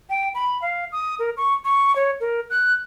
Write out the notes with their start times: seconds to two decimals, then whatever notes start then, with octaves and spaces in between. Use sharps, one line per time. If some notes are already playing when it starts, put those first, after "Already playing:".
0.10 G5
0.35 B5
0.62 F5
0.92 D#6
1.19 A#4
1.37 C#6
1.65 C#6
1.96 C#5
2.20 A#4
2.50 F#6